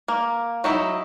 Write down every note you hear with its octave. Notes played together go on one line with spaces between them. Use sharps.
A#3
F#3 D#4 E4